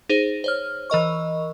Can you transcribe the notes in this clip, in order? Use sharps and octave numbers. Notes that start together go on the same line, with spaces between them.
D#4 G#4 C5
C5 C#5 F6
E3 A#4 D#5 C#6